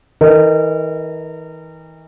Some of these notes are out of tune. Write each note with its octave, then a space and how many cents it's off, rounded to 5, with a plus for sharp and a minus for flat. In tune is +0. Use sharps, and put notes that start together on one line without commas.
E3 -40 A#4 -35 D#5 -10